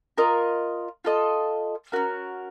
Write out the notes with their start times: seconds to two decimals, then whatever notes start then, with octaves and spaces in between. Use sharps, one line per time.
0.18 F4 A#4 D#5
1.05 F4 A4 D#5
1.92 C#4 F#4 A#4